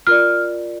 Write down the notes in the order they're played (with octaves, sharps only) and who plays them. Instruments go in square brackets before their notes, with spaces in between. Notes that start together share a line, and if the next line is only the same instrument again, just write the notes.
[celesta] F4 A#4 D5 F6